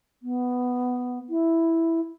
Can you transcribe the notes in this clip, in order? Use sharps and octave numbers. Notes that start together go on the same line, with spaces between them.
B3
E4